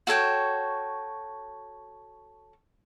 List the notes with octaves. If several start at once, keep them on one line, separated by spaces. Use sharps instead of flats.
F#4 A4 C#5 G5